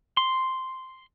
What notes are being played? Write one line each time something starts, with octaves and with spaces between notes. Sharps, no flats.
C6